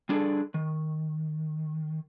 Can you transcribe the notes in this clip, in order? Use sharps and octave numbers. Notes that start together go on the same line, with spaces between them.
G3 D4 G#4 A4 D5
D#3